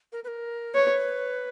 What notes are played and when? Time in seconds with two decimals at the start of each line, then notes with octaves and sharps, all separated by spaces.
0.12 A#4
0.24 B4
0.28 A#4
0.74 B4 C#5